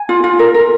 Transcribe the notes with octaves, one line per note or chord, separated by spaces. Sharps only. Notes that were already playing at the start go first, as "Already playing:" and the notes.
Already playing: G#5
F4
F4
A#4
A#4